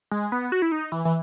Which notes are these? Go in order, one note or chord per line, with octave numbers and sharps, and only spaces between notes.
G#3
B3
F#4
E4
D#4
E3
E3